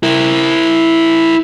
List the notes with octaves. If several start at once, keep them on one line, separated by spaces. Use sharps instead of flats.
E4 A#4